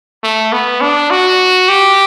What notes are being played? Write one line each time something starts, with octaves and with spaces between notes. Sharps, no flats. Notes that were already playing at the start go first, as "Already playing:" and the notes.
A3
B3
D4
F#4
G4